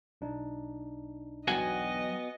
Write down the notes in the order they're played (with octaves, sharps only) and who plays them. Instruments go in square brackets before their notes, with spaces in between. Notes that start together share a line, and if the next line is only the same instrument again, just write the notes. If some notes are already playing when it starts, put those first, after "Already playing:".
[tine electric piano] B1 D4 D#4
[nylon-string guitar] E2 F#3 G5 [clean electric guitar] B3 F#4 G#5 [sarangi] D#5